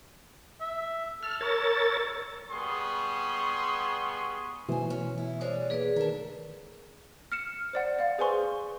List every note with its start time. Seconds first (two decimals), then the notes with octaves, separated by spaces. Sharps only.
0.60 E5
1.23 A4 F6
1.41 A#4 C#5 A6
2.50 G3 B3 G#4 C6 C#6 D#6
4.69 B2 E3 A3 C5 G#5
4.90 C#4
5.18 E4
5.41 G3 G#3 C5 C#5
5.70 A#3 G#4 B4 D5
5.96 D#3 A4 A#4
7.32 F6 C#7 E7
7.73 C5 D5 F#5
7.99 D5 F5
8.18 G#4 B4 C5 G#5 C6 C#6